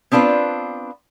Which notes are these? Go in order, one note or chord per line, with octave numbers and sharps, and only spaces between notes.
B3 C4 D4 F4 B4